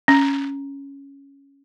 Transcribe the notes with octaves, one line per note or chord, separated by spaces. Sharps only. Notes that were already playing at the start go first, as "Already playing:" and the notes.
C#4